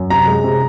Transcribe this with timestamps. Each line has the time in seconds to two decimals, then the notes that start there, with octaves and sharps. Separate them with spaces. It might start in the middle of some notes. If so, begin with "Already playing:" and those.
Already playing: F#2
0.10 C3 A#5
0.27 G#3
0.44 C3